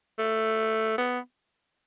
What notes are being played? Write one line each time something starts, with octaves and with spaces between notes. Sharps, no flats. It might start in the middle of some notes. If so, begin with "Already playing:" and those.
A3
B3